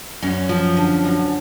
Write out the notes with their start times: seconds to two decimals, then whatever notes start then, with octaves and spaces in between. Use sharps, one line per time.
0.22 F#2 C#4
0.49 F3
0.77 D3
1.04 F#2